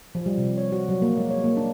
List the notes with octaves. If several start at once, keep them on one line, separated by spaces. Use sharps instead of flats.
F3
G3
C3
C#5
F#4
F#3
A#3
G#3
C#5
A#3
D4